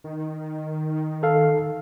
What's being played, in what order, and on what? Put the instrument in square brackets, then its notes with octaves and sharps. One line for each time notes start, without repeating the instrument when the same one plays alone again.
[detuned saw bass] D#3
[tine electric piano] A4 F5